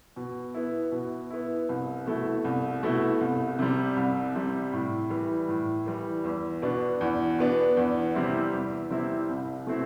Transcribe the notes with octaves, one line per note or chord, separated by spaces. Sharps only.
B2
B3 E4
B2
B3 E4
C2
B2 A3 E4
C2
B2 A3 E4
C2
C3 G3
C2
C3 G3
A2
E3 G3
A2
E3 G3
E2
B2 B3 D4
E2
B2 B3 D4
E2
C3 G3 C4 E4
E2
C3 G3 C4 E4
C2
B2 A3 C4 E4